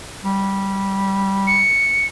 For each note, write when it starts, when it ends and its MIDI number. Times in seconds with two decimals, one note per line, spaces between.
0.24 1.67 55
1.47 2.07 97